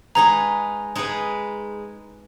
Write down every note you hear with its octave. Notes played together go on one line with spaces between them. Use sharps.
G#3 D#4 G#4 B4 A#5
G#3 D#4 G#4 B4